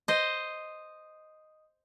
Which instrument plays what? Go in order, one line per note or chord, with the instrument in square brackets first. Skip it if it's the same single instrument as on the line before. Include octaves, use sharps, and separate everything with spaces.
[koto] C5 D#5